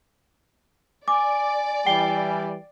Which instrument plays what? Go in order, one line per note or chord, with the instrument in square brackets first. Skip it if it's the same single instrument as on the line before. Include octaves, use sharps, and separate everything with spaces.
[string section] D5 [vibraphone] G#5 [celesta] D6
[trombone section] E3 G3 [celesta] G5 C7 G7